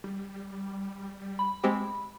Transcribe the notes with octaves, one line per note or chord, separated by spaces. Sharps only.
G3
B5
G#3 C4 G4